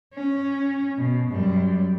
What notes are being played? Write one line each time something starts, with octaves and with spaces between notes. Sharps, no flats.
C#4
B2
F#2 G3